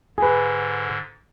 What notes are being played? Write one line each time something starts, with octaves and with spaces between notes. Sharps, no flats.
G#2 D3 G#4 B4